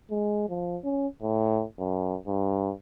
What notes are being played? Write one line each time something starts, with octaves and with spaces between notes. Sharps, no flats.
G#3
F3
C#4
A2
F#2
G2